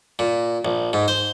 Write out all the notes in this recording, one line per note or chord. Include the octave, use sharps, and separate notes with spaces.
A#2
A#1
G#2
C5